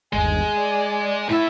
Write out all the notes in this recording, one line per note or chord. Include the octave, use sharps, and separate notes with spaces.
G1 D#2 G#3 G#5
D5
A2 E4 E5